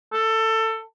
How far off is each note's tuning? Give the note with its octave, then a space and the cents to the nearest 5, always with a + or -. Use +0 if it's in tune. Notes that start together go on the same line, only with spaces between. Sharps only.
A4 +20